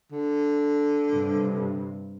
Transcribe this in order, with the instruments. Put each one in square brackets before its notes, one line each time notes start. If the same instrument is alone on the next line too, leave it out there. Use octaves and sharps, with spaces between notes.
[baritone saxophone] D3
[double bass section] G2 C3